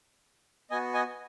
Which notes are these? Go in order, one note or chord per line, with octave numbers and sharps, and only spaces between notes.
B3 F#4 D#5 G#5
D#5 G#5